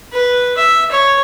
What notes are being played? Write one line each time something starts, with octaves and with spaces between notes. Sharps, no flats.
B4
E5
C#5